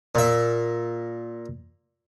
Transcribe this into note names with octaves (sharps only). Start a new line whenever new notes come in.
A#2 E5